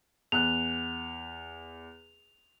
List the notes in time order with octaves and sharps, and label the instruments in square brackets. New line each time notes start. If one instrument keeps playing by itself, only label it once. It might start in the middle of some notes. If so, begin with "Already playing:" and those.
[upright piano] E2 F#6 [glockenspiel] F7